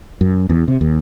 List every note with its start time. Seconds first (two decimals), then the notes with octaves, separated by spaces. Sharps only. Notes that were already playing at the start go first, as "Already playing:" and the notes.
0.21 F#2
0.49 E2
0.68 C3
0.81 D#2